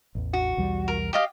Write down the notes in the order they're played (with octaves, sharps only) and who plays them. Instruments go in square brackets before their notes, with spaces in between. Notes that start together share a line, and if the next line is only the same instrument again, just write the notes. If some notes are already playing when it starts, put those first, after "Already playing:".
[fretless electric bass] A1 E2
[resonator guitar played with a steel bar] F#4
[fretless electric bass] B1 E2 G3
[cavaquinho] A#4
G4 D#5 F5